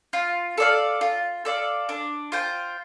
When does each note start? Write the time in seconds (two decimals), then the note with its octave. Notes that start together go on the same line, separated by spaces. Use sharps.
0.13 F4
0.58 A4 D5 F5
1.01 F4
1.45 A4 D5 F5
1.89 D4
2.32 F4 C5 G5